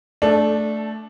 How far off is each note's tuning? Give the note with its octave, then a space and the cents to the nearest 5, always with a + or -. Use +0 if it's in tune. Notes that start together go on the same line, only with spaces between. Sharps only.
A3 +0 D4 +0 A4 -20